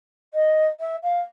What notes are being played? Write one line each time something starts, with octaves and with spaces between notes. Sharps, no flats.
D#5
E5
F5